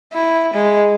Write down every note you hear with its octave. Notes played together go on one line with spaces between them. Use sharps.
E4
G#3